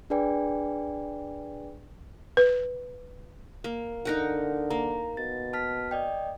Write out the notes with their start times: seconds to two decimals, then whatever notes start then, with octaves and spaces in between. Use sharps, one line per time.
0.10 D4 G#4 B4 D5 G5 G#5
2.37 B4
3.64 A#3
4.05 D3 D#4 A#4 F#5
4.71 A#3 A#5
5.17 B2 A6
5.53 A5 F6 B6
5.91 D5 D#5 G5